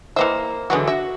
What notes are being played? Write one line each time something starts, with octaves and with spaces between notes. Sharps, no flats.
E3 A#3 C5 D#5 E5
D3 E3 F#3 G#3 B3 F#4
F#4 E5